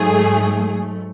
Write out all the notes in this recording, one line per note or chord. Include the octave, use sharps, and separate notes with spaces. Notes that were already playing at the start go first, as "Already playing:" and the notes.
Already playing: G#2 F#3 A3 G#4